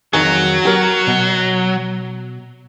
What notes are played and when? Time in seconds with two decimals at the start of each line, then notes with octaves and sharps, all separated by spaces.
0.13 F2 D#3 F#3 G#4
0.65 G4 A#4
1.07 B2